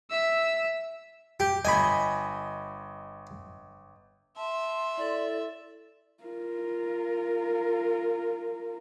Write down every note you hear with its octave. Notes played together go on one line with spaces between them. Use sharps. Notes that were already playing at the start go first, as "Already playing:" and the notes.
E5 E6
G4
G1 D#5 G#5 B5
E5 A5 C6
E4 A4 C#5 D5
F4 A#4